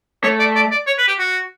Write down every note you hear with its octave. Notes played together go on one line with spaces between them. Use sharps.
A3 C#5
D5
D5
D5
C#5
B4
G4
F#4